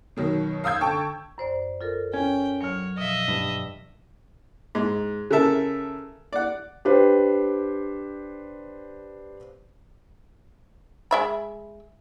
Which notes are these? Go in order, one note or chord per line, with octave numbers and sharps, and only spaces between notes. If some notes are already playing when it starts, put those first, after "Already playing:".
B2 D#3 F#3
F5 D#6 E6 G6 G#6
D3 G5 A5 C#6
F#2 C5 D5
F4 A4 A#4
C#4 G5 G#6
F#3 C#5 F6 C#7
B2 F3 D#5 E5
G2
G#2
C#3 A4 A#4 E5 A5
D5 F#5
D4 G4 B4 C5
G#3 E5 B5